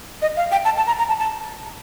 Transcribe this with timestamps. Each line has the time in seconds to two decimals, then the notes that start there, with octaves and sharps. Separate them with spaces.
0.22 D#5
0.36 F5
0.52 G5
0.65 A5
0.77 A5
0.87 A#5
0.98 A#5
1.09 A5
1.19 A5